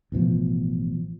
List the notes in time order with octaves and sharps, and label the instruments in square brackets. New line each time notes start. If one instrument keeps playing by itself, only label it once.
[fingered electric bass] A1 B2 D#3 F3